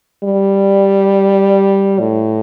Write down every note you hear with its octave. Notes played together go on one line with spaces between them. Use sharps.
G3
A2